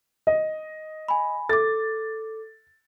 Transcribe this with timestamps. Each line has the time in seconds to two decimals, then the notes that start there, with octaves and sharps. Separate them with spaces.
0.27 D#5
1.08 G#5 B5
1.49 A4 D6 A6